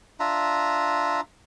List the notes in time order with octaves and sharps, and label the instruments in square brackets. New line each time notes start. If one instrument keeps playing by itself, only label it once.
[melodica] D4 F4 E5 A#5